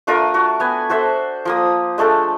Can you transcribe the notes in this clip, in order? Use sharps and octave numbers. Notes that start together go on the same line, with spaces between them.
A3 D4 F4 A#4
F#4
B3 G#5
F#4 A4 C5 E5
F3 A#3 D#6
G#3 A3 D4 A4